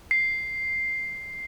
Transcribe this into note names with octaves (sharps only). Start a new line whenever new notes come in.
C7